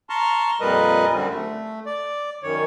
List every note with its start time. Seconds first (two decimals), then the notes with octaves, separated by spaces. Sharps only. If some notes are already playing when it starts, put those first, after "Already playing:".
0.10 A5 A#5 C6 C#6 F6
0.61 F2 A#2 G3 A#4 B4 D#5
1.13 F#2 D3 G3 C4
1.30 A3
1.86 D5
2.43 F#2 D#3 C#5